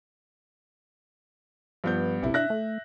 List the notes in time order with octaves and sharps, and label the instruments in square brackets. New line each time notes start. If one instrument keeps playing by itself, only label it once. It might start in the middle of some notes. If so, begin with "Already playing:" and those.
[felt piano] G2 B3 G6 [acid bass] F3
[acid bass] A#1 [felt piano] C3 E4
[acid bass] D4 [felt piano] E5 F#6 A#6
[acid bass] A3